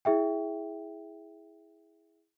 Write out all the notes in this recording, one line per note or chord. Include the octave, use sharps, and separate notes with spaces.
E4 G#4 E5 G5